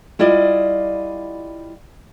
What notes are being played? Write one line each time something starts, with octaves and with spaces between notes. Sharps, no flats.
G3 E4 F4 D5 D#5